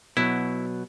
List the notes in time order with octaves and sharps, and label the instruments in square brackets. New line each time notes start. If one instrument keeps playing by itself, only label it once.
[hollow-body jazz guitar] B2 F#3 [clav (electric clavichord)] E4